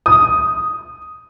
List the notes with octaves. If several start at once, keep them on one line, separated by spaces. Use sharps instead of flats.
D#6